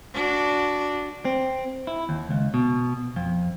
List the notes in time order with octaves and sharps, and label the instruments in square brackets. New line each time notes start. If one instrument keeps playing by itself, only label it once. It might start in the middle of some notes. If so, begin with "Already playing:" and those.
[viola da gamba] D4 F#4
[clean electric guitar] C4
E4
D#2
C#2
B2
F2